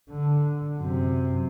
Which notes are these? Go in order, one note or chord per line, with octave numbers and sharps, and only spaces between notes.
D3
F#2 C3